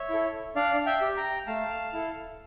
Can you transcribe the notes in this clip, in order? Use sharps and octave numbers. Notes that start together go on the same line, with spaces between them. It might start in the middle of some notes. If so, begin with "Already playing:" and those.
Already playing: C#5 E5
E4 A4
D4 D5 F5
E5 G5
G4
G5 A#5
A3 F5 A5
E4 A4